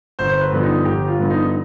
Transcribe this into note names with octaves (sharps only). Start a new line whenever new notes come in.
G1 C5
B4
G2 D3 F3 B3
D#4
G1 G4
F4
G2 D3 F3 B3
D#4
D#4